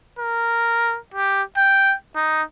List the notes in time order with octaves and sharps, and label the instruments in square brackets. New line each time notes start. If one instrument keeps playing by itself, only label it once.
[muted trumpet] A#4
G4
G5
D#4